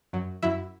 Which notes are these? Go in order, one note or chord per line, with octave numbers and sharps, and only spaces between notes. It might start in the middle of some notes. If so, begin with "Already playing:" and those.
F#2 F#3
F#2 F#3 E4 E5